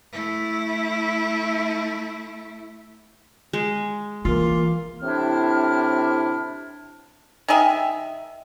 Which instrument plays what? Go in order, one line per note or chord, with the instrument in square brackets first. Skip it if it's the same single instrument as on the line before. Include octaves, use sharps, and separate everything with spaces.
[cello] A3 E4
[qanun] G#3
[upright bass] E3 [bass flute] A#3 [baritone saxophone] F4
[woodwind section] A2 C3 C4 D4 E4 F6
[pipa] D#3 G4 G#4 E5